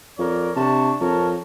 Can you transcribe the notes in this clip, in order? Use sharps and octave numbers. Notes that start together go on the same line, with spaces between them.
F2 A#4 C#5 D5
C3 D4 A5 C#6
F2 A#4 C#5 A5